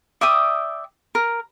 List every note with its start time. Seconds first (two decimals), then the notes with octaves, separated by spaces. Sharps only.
0.21 D5 E5 G5 D#6
1.15 A#4